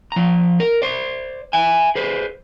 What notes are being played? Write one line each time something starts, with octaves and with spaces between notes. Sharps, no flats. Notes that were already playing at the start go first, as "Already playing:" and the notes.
F3 A#5
A#4
C5 D5
E5 G#5
G#4 B4 C5